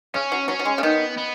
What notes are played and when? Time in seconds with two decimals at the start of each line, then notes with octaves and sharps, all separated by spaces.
0.14 C#3 C#4
0.32 F#3
0.48 F#3 C#4
0.59 F#3
0.65 G#3
0.78 C#3
0.83 D#3 B3
1.17 B3